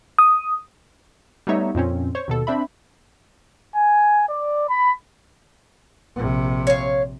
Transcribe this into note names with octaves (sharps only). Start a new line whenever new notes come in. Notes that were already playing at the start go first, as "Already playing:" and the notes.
D#6
G3 A3 B3 D#4 C#5 E5
F2 A#2 C4 C#4
C5 C#5 C#6
D#2 B2 A4
C4 D4 E5 B5
G#5
D5
B5
A#1 C3
C#5 F5